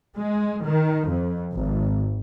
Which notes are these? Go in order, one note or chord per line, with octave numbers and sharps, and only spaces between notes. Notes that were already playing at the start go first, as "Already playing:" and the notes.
G#3
D#3
F2
G#1